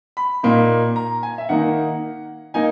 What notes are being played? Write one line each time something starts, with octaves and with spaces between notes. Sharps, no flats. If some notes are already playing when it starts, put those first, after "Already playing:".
B5
A#2 A#3 D#4
A#5
G#5
E5
D#3 A#3 D#4 F#5
A#3 D#4 G#5